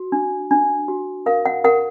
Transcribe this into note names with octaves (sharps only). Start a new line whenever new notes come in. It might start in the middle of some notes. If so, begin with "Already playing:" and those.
Already playing: F#4
D4
D4
F#4
A#4 F5
F#5
A#4 F#5